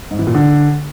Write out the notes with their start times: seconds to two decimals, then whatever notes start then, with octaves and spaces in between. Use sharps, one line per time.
0.11 G#2
0.19 E3
0.27 A#2
0.35 D3